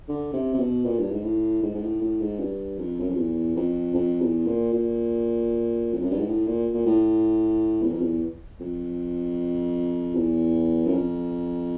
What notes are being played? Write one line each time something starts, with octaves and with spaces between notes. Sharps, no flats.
D3
C3
C3
B2
A#2
G2
G#2
A2
G#2
G#2
A2
A2
G#2
G2
F2
F#2
F2
E2
F2
F2
E2
A#2
A#2
F2
F#2
G2
G#2
A2
A#2
A#2
A2
E2
F2
E2
F2
E2
F#2
F2